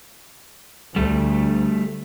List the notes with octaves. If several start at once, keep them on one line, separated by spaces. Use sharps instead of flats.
D2 G3 A3